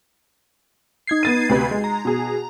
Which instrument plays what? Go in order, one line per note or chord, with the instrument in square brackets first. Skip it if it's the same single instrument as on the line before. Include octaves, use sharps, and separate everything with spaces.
[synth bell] D#4 G#6 C7
[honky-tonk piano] B3 A6 D#7
D2 C3 B4
G#3
[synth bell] A#5
[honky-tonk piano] B2 G#4